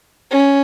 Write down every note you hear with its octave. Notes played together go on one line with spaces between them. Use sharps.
C#4